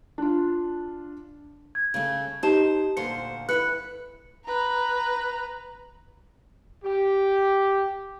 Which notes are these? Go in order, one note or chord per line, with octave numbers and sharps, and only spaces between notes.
D4 F4
G#6
C#3 A3
D#4 G4 C5 A5 E7
D2 A#2 C5 C#7
D2 E4 B4 F#6 C#7
B4 A#5
G4